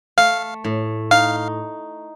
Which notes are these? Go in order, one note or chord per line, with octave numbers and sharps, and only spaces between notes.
A3 F5
A2
D#4 F5